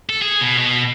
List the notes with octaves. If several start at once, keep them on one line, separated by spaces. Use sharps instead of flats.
A4
G#4
B2
B2